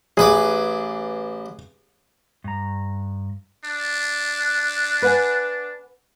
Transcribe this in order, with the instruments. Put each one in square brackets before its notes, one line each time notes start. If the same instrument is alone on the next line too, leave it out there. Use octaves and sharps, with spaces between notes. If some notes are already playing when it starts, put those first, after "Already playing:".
[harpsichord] A1 B4 D6 [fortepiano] G#4
[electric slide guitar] G2 A#5
[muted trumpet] D4
[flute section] F#6
[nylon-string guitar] B4 F#5 G#5